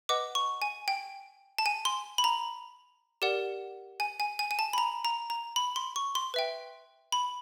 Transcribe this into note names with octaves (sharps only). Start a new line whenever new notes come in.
B4 D#5 F#5 D6
C#6
G#5
G5
A5
G#5
C6
B5
A#5
G4 A#4 D5 F#5
G#5
G#5
G#5
G#5
A5
B5
A#5
A#5
A#5
B5
C6
C#6
C6
B4 E5 G5
B5